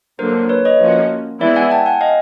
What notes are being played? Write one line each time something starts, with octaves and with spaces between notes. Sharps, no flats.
D3 F#3 A#3 A#4 C5
B4 C#5
C#5 D#5
F3 A#3 C#4 F#4
E3 G#3 B3 E4 D5 E5
F#5 G#5
G5 A5
F#5 G#5
D#5 F5